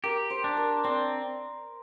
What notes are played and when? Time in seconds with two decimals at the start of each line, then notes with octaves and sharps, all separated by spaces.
0.04 G4 A#4
0.30 C5
0.44 D4
0.57 A#4
0.84 C4 D5